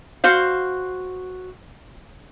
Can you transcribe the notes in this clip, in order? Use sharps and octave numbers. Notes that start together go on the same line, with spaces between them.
F#4 C5 F5